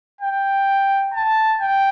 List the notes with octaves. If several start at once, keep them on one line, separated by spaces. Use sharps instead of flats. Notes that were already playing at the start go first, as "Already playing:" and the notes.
G5
A5
G5